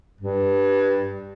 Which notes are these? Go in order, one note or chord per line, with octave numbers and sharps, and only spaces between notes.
G2